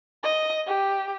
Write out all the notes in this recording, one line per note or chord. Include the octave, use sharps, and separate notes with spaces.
D#5
G4